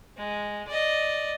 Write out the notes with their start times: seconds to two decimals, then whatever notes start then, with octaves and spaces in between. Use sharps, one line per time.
0.17 G#3
0.67 D5 D#5